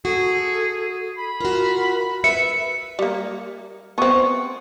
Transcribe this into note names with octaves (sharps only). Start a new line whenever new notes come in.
F#4 G#4 A4
B5
F4 F#4 A#4
B4 E5 C#7
G3 A#3
B3 C4 C#6